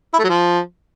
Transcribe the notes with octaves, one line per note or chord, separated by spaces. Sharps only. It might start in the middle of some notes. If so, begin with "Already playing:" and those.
E4
A3
F#3
F3